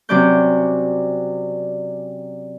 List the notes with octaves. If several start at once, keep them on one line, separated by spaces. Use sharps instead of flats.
C3 F#3 C#4 D5 D6 G6